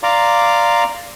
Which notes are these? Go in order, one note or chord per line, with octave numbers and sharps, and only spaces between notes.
D5 F5 A#5 C6 D6